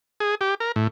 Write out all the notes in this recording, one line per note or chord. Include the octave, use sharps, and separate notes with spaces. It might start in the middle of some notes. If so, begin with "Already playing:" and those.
G#4
G4
A#4
A2